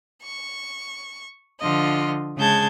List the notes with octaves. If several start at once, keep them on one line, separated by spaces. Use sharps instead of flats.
C#6
D3 F3 F4 D#5
C#3 G#3 G#4 A5 G6 G#6